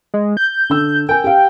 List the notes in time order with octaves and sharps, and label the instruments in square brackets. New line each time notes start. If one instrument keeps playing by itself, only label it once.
[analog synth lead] G#3
G6
[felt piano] D3 E6
[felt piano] A#4 G#5 [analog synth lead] G5
[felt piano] G4 F5